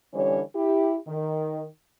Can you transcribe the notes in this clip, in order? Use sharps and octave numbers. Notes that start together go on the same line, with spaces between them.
D3 E3 G3 C#4 C#5
E4 G4
D#3